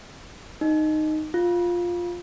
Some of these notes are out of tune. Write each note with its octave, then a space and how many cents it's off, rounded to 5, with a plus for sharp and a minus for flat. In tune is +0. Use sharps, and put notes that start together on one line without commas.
D#4 -10
F4 +5